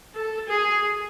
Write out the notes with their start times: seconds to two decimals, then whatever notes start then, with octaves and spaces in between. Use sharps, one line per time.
0.15 A4
0.48 G#4